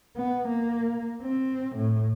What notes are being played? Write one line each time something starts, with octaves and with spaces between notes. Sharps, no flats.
B3
A#3
C4
A2